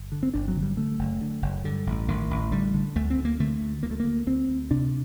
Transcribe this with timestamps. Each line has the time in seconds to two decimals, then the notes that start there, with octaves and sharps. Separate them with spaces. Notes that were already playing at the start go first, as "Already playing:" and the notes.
Already playing: G1
0.12 D3
0.23 C4
0.34 G1 D4
0.48 F#3
0.55 D3
0.63 G3
0.77 D3 A3
0.99 F#1
1.21 D3
1.42 F#1
1.64 G2 D3
1.87 A1
2.08 A1 D#3
2.31 A1
2.52 D3 G3
2.74 D3
2.96 D2 A3
3.10 C4
3.18 D2
3.25 A#3
3.40 D3 A3
3.61 D2
3.83 D2 A#3
3.91 A3
4.00 D2 A#3
4.27 D2 C4
4.49 D2
4.71 C3 D4